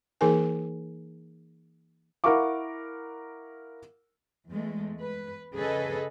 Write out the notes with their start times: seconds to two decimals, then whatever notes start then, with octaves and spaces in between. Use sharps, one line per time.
0.21 E3 A#3 D#4 G#4 A#4 G#5
2.24 E4 A#4 F5 F#5 C#6 D6
4.50 E2 G#3 A3
5.00 B4
5.55 C#3 G#4 A4 B4 D#5